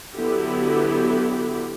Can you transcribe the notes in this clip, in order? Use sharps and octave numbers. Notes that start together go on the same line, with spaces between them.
D3 F#3 B3 E4 G4